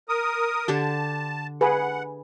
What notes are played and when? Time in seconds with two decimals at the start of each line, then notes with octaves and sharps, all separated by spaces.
0.09 A#4 D#6
0.68 D3 D4 G4 A5
1.61 G#4 B4 F#5